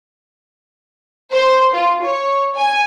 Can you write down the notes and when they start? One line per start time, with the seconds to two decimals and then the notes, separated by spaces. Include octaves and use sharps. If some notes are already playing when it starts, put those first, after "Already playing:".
1.32 C5
1.74 F4
2.03 C#5
2.56 G#5